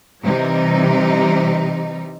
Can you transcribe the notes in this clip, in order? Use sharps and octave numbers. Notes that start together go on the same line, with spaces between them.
C3 E3 G3 D#4